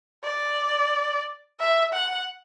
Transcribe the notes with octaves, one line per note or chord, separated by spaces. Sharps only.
D5
E5
F#5